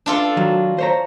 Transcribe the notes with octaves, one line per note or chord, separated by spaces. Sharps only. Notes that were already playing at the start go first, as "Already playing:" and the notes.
D4 F4 A4
D#3 F#3
C5 C#5 A#5